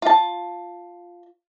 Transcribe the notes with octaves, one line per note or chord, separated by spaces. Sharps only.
F4 A5